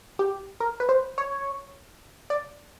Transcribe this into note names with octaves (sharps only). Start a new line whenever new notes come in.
G4
A#4
B4
C5
C#5
D5